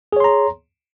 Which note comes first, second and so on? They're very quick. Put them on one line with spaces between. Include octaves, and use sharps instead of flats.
G#4 C#5 C6 A#5